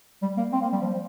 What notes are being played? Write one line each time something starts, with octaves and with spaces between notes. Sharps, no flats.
G3
A#3
C4
A#3
G3
F3